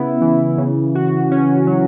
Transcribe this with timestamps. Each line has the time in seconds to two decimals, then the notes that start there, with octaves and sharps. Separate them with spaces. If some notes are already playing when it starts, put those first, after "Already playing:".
Already playing: C#3 B3 E4
0.21 E3
0.58 C#3
0.95 F#4
1.31 C#4
1.67 F#3